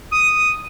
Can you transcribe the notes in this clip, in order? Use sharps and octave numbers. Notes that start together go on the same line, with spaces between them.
D#6